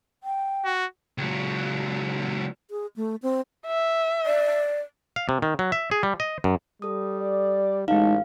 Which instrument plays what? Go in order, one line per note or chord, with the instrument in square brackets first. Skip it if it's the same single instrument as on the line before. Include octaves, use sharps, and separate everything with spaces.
[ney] G5
[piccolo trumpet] F#4
[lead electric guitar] C#2 F#3
[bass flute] G#4
A3
C4
[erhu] E5
[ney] D5
[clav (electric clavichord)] F5
C3
D#3
F#3
E5
G#4
G3
D#5
F#2
[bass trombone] G3 [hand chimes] A4 D#6
[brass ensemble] D5
[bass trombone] A1 [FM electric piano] G#3 D#4 [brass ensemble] F#4 A5 [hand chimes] F5